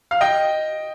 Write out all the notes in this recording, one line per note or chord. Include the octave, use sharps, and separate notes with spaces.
F5
D#5 G5